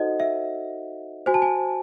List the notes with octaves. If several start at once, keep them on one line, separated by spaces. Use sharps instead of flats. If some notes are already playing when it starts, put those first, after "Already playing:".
Already playing: D#4 F#4 A4 C5 D#5 F#5
E5
F#4 C5 G#5
A5
G#5